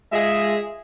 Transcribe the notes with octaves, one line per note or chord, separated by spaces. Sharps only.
G#3 F4 G#4 D#5 E5